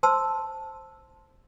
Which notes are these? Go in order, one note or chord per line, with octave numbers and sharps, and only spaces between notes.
C5 A5 C6 E6